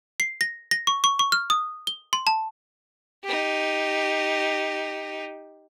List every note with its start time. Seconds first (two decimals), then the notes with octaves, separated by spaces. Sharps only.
0.20 C7
0.41 A#6
0.71 A#6
0.87 C#6
1.04 C#6
1.19 C#6
1.32 F6
1.50 D#6
1.87 G7
2.13 C6
2.27 A5
3.24 D#4 G4